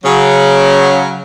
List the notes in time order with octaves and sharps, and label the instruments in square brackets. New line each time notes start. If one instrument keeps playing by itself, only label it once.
[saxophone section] C#3 F#3